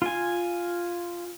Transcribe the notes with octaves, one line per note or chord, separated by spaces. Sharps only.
F4 G#5